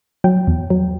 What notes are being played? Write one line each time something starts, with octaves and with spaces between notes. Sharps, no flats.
F#3 G5
E2
F#3